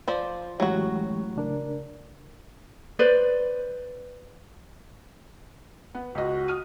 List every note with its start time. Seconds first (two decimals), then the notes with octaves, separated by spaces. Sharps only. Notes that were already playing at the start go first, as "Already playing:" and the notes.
0.08 F3 C5 D5
0.60 F#2 A2 E3 F#3 G#3 F#4 G4
1.36 C#3 D4 A#4
2.99 B4 C5 D5
5.95 B3
6.15 C#2 F#4 D#5
6.48 D#6 F6 D#7